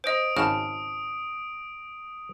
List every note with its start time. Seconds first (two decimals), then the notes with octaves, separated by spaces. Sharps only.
0.04 C5 D#5 D#6 D7
0.37 G#1 C#3 F#4 A5 F6